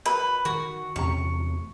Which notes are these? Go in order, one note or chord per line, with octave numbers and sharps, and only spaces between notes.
F#3 A#4 B4 B5
D#3 F#4 A#4
E2 C3 A3 C#4 G4 A#5 C#6